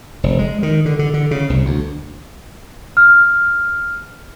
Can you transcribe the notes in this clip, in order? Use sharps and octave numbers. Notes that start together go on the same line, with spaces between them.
F1
G#3
D#3
D3
D3
D3
C#3
C2
D2
F6